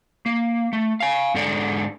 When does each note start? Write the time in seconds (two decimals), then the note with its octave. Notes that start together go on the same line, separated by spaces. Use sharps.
0.26 A#3
0.73 A3
1.00 F5 G#5
1.34 G#2 D3 G#3 A4 D5